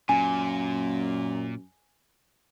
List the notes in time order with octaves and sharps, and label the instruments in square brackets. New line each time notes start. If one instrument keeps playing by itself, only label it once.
[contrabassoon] F#2 [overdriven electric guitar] A#2 [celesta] G#5